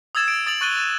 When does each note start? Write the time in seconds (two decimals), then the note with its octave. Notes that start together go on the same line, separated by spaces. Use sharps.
0.15 D#6 E6 G#6 A6 E7
0.28 D7
0.46 D#6 A6 F7 F#7
0.61 C#6 F#6 A6 D#7 G7
0.76 A6 D#7 E7